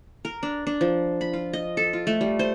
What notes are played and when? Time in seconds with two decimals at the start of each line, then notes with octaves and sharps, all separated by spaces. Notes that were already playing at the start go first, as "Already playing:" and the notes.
0.25 A#4
0.43 D4
0.67 D4
0.81 F3
1.21 B5
1.33 F4
1.53 D#5
1.77 A4
1.93 F4
2.07 A3
2.21 G3
2.39 C5